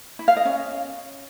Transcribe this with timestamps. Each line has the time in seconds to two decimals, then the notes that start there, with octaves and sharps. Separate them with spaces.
0.19 E4
0.28 F5
0.37 D#5
0.45 C#4